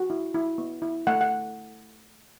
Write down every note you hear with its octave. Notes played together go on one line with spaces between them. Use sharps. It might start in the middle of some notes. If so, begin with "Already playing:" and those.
Already playing: F#4
E4
E4
B3
E4
A3 F#5
F#5